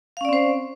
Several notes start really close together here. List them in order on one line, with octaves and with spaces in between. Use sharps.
F5 C#4 D5 C4 C5